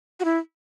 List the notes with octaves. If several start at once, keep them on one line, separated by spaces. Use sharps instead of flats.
F#4
E4